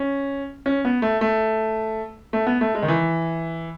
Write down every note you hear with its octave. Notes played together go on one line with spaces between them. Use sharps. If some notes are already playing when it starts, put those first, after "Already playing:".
Already playing: C#4
C#4
B3
A3
A3
A3
B3
A3
G#3
D#3
E3